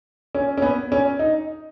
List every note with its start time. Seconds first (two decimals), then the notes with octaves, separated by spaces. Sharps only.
0.35 C#4
0.58 C#4
0.62 B3
0.92 C#4
1.19 D#4